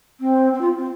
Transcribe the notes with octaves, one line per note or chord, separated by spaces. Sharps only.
C4
C4
F4
C4